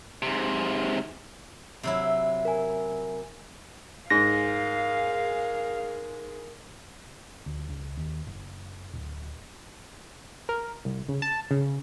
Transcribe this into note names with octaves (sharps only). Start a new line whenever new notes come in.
G#2 C3
C3 F#3 E4
A#4 G#5
G#2 G#4 A#4 F5 A#6
D2
C#2
D#2
F#1
D1
A#4
C2
C#3
A5
C#3